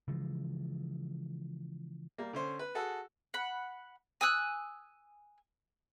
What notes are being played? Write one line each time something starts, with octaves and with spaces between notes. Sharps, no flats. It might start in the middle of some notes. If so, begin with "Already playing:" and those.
C#3 E3 F3 G#3
G3 A#3
D3 C#4 C5
B4
F#4 G#4 A4 F#5
F#5 B5
G#5 D#6 E6 F#6